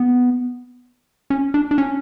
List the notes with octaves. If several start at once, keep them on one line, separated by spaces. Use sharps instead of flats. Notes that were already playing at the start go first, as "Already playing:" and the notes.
Already playing: B3
C#4
D4
D4
C#4